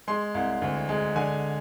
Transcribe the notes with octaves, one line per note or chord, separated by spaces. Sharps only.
G#3 C6
C2
D2
G#3
D3 G#5